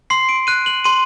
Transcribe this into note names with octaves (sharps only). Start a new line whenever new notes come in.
C6 C7
D7
F#6 D#7
F#7
C6 D#7